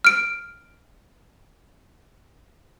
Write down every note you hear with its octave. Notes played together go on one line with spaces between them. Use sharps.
F6 D7